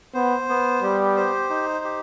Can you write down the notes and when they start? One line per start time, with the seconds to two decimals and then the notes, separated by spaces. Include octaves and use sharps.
0.14 B3 C5
0.49 B3
0.82 G3 G4
1.17 C5
1.50 D#4
1.84 G4